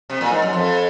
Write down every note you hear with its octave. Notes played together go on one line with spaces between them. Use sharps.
C3
A#2
G#2
F#2
F2